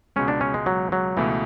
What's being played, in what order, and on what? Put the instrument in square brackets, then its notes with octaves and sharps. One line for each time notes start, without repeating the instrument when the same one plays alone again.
[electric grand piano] C#2 B2 G#3 [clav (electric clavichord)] C#4
[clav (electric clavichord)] D4
C#4
G#3
F#3
F#3
[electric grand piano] C#2 B2 A3 [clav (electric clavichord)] E3